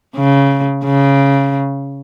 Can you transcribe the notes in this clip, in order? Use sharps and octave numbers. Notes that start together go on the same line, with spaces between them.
C#3
C#3